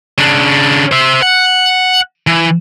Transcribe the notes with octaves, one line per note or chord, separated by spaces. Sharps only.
C#3 D4
C5 E5
F#5
E3